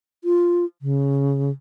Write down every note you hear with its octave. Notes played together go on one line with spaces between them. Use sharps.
F4
C#3